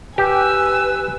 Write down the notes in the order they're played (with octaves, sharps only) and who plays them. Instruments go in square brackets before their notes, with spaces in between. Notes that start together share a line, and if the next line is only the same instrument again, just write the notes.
[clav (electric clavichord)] G4 [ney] B4 [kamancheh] G#5 E6